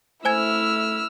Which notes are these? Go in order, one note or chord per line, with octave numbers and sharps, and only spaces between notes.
A3 E4 C5 G#5 E6 F6 G#6